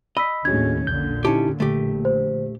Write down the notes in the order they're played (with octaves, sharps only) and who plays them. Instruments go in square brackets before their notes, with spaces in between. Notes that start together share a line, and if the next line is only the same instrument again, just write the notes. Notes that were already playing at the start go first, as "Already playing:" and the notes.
[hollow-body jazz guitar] D#5 [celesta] B5 E6 B6
[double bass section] D#2 A2 C#4 [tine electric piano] D4 F#4 G#4 [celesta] G#6
[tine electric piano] A#1 E2 G6 [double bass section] A#2 D3
[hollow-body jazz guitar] C#4 G4 [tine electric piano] D#4 E4 A5
[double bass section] A#1 [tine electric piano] D3 [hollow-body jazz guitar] A3 G4
[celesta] C5